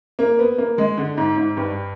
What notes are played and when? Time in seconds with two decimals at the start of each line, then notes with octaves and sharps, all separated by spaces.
0.19 A#3
0.39 B3
0.58 A#3
0.78 G#3
0.98 D3
1.18 G#2
1.37 G#2
1.57 G2